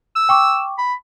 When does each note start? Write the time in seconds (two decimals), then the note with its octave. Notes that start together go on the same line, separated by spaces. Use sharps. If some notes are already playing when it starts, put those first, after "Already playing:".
0.16 E6
0.29 G5 C#6 D6
0.78 B5